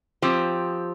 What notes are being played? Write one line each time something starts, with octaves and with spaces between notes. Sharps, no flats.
F3 C4 G4